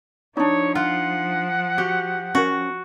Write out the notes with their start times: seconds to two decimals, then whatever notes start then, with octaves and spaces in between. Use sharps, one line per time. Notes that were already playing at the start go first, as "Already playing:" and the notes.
0.37 F3 D4 D#4 C#5
0.75 F4 F#5
1.78 F#4 G4
2.35 C#4 F#4 A#4